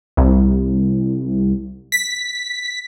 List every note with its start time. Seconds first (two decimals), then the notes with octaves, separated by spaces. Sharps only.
0.17 C2
1.92 B6